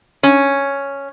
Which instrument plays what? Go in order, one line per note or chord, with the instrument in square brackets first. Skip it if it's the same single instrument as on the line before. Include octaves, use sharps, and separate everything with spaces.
[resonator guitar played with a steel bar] C#4